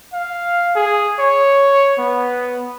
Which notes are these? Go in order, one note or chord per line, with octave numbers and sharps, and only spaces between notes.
F5
G#4
C#5
B3